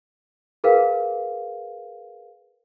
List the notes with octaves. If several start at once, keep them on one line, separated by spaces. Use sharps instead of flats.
G#4 A#4 B4 F5 G5